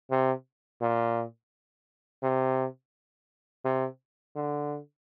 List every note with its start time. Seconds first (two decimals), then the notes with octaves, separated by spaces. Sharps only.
0.10 C3
0.81 A#2
2.23 C3
3.65 C3
4.36 D3